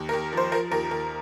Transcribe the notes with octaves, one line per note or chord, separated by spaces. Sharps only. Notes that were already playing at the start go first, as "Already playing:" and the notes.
Already playing: D#2
A#4
D#2
F3 C5
F3 A#4
D#2 A#4
D#2 A#4